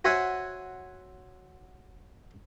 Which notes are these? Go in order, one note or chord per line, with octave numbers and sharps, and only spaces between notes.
F#4 C5 C#5 E5 F#5 G#5